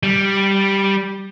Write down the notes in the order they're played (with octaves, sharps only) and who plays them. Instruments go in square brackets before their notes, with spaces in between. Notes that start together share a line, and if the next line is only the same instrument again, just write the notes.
[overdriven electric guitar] G3